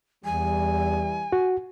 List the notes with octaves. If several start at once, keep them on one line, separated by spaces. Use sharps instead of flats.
E2 E3 G3 G#5
F#4